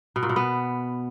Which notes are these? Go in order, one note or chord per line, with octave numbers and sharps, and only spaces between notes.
B2
A#2
B2
B3